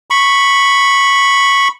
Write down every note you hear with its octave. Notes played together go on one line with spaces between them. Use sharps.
B5 C#6